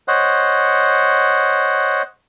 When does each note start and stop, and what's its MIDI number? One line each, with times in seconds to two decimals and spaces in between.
0.08 2.02 72
0.08 2.02 73
0.08 2.02 75
0.08 2.02 78